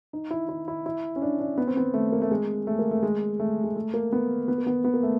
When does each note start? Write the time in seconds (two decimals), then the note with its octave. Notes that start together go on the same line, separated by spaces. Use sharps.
0.13 D#4
0.31 E4
0.49 E4
0.68 E4
0.86 E4
1.16 C#4
1.22 D4
1.40 D4
1.58 B3
1.67 C4
1.77 B3
1.94 A3
2.12 A#3
2.22 A3
2.31 G#3
2.67 A3
2.79 A#3
2.91 A3
3.03 G#3
3.40 A3
3.64 G#3
3.76 A3
3.94 A#3
4.12 B3
4.48 B3
4.58 A#3
4.67 B3
4.84 B3
4.94 A#3
5.03 A3